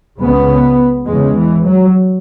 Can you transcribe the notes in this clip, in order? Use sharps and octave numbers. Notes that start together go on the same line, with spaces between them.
C#2 C#3 B3
E2 C#3 G#3
E3
F#3